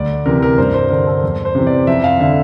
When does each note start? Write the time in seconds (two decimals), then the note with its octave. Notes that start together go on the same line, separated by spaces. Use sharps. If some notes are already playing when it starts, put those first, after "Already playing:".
Already playing: D2 D5
0.26 C3 E3 A#4
0.42 A#4
0.58 G2 C5
0.74 C5
0.90 D3 A#4
1.07 A4
1.23 E2
1.45 C5
1.55 C3 E3
1.67 D5
1.87 F2 E5
2.04 F5
2.20 D3 E5